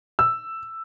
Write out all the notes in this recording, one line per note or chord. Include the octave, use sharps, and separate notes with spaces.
E6